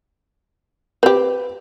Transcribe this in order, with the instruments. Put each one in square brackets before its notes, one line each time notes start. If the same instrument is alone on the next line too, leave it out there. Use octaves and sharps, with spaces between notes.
[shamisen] C4 G4 [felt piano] B4